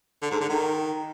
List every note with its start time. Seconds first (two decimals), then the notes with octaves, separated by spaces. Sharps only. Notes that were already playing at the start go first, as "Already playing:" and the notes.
0.22 D3
0.31 G#2
0.40 D3
0.49 D#3